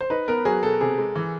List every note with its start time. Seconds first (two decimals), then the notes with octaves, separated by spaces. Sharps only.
0.01 C5
0.10 D#4 B4
0.28 B3 A#4
0.45 F#3 G#4
0.63 B2 A4
0.81 C3 G#4
0.98 G#3
1.15 E3